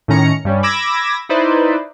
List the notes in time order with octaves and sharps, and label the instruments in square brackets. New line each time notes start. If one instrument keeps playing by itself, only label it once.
[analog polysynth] A2 D#3 C#4 A#5 C#7
G2 G3 C#4
B5 D6 E6 G#6 A#6
D#4 E4 B4 C5 D5